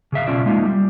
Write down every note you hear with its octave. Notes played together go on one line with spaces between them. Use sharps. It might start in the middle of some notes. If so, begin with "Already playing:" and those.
C#3 G#4 E5 F5
B2 C#4 F4 D5 E5
G#3 A#3 D#4 F4
G3